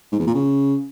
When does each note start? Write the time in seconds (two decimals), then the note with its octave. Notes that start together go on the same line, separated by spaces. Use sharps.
0.12 G#2
0.20 E2
0.27 A#2
0.34 C#3